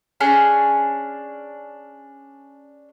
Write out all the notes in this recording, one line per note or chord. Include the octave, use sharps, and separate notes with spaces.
C#4 D4 G#4